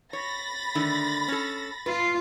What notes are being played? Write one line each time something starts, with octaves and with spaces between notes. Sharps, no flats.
C#5 B5 A6 A#6
D3 D#3 A3
C#4 A4
F4 B4